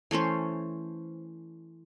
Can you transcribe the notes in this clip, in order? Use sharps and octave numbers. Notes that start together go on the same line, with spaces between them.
E3 A3 C#4 C5